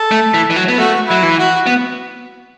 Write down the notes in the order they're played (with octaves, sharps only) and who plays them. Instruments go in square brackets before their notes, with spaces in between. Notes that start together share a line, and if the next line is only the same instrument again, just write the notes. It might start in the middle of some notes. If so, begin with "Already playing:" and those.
Already playing: [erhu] A4
[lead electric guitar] A3
E3
E3
F#3
B3
[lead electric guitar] A3 [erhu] F#4
[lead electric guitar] F#3 [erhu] E4
[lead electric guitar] E3
[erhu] F#4
[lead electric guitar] B3